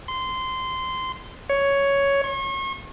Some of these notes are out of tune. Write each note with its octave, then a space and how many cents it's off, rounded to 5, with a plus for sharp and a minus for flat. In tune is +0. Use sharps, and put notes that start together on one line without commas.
C6 -15
C#5 +5
C#6 -40